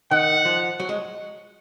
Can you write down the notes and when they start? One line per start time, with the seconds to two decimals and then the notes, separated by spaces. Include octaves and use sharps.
0.11 D#3 F#5
0.45 F3
0.80 F#3
0.89 G#3